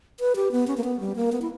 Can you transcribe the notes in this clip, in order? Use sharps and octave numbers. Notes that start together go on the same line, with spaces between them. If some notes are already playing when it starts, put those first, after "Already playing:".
B4
G4
B3
C#4
A#3
B3
G3
A#3
B3
E4